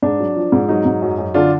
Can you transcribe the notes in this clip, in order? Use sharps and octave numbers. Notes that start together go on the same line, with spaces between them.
G#2 D4
F#3
F3
G#2
F#3 D#4
G#2
F#2
F#2
D3 D4 F4